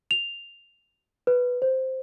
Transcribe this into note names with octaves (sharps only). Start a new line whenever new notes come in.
F7
B4
C5